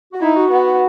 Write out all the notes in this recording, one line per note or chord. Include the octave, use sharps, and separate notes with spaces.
F#4
D#4 E4
F#4
B3